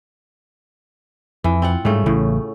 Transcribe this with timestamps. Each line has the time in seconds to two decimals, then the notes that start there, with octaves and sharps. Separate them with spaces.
1.44 F2 E3
1.62 C4 F4 F#5
1.85 G#2 C#3 G3 A3
2.06 A1 A2 C#3